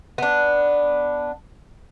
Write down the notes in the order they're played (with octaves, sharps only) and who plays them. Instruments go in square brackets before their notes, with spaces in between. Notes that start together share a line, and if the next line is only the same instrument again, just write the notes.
[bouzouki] B3 D4